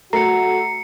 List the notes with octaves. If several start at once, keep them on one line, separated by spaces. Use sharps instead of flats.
A3 F#4 A#5 C7 C#7